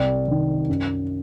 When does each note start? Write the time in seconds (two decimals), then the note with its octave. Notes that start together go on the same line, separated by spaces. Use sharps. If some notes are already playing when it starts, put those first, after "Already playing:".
Already playing: C2 G3
0.28 C3 D#3
0.69 F#2